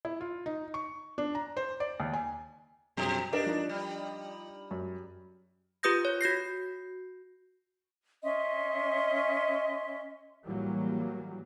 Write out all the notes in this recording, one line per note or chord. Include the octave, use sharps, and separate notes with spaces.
E4
F4
D#4
C#6
D4
A#5
C5
D5
D#2
G#5
F#2 B2 G3 D#6
D4 G4 A#4 D#5
F3 D#4
G3
F#2
F4 G4 B4 D#6 G6 A#6
C#5
F#4 G6 A#6 C7
C#4 D#5 E5 C6
A2 E3 F#3 G3 A#3